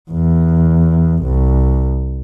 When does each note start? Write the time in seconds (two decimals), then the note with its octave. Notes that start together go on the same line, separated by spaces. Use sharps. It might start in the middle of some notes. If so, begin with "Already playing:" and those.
0.11 E2
1.23 C2